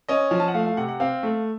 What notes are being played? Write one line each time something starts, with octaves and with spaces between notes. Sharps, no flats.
C#4 D#5
F3
A5
F#5
A3 F5
F5
C3 F#5
F#5
C4 F5
A3